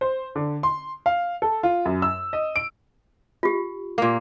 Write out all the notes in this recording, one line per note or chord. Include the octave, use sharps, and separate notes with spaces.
C5
D3
C6
F5
A4
F4
F#2
E6
D#5
D7
F4 G4
A#2 A#3